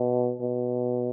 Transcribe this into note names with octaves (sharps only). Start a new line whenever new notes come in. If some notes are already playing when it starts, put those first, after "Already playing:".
Already playing: B2
B2